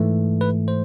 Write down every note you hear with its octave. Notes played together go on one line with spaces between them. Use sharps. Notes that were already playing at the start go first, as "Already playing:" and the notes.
Already playing: G#2 E3 A3
B4
C5